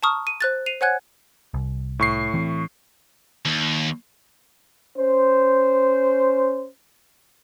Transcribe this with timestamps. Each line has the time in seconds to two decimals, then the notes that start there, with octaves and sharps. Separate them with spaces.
0.03 A5 A#5 C#6 D#6 F6
0.27 D#7
0.41 C5 F#6 A6
0.66 C7 D#7 F7
0.81 C5 C#5 F#5 G#5 F#6 G#6
1.54 C2
1.99 A2 C#6 C7
2.34 E3 C4
3.45 D#2
4.98 C#4 C5